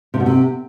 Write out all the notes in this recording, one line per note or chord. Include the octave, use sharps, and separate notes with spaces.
C3
B2
C3